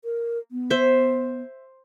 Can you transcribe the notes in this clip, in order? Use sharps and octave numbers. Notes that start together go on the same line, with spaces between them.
A#4
B3
C5 E5